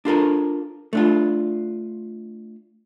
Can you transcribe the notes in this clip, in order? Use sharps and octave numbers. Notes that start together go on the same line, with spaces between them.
D4 F4 A4 A#4
A3 D4 F4